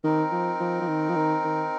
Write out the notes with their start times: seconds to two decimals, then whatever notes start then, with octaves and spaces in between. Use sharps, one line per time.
0.04 D#3 C4 D#4 A#4
0.32 F3
0.60 F3
0.82 F3
0.88 D#3
1.09 F3
1.16 D#3
1.44 D#3